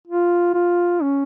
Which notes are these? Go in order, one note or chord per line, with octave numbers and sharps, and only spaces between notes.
F4
F4
C#4